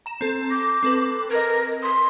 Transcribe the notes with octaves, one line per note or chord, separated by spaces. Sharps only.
A#5 E7
C4 A4
D6 G6 A#6
C4 A4 B4
A#4 D#5 G#6
C6 D#6 B6